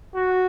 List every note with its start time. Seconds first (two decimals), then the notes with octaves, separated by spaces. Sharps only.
0.16 F#4